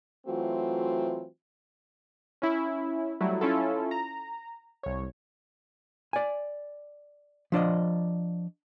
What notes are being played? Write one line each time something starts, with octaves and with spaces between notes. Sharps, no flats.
E3 F#3 A3 C4 F4 F#4
C#4 E4
F#3 G3 A3 E4
C#4 E4 F4 A4
A#5
C2 C#5
D5 G#5
F3 D4 D5 D#5